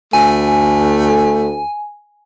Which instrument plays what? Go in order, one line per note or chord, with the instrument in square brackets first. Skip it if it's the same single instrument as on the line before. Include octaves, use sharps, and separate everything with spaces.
[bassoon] D2 [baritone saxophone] A3 [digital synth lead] G#5